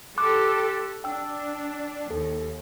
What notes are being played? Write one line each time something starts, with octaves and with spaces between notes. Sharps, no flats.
G4 A4 C6 D6 F#6
D4 G5 E6
D#2 A4